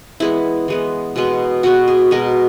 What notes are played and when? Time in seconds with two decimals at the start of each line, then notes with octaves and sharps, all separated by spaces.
0.20 E3 G#3 B3 E4
0.68 E3 G#3 B3
1.16 B2 G#3 B3
1.63 B2 G#3 B3 F#4
1.88 G#4
2.11 B2 G#3 B3 A#4